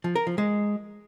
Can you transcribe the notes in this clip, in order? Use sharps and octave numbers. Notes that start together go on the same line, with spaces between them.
F3
A#4
F3
G#3